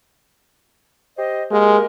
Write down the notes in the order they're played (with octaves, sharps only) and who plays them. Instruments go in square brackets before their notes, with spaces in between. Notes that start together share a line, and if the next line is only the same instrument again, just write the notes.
[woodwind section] G4 C5 D#5
[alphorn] G#3 [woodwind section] A#3 G4 A#4